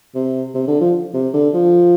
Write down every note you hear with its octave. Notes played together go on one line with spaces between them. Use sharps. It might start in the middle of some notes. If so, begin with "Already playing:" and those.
C3
C3
D3
F3
C3
D3
F3